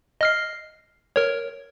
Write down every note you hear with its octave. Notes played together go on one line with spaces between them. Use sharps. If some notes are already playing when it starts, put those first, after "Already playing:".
D#5 F6 C7
A#4 C#5